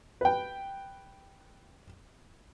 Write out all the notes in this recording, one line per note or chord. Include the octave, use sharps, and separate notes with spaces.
B4 G5